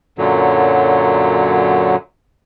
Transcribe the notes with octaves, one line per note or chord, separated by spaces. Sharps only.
F#2 A#2 D3 F#3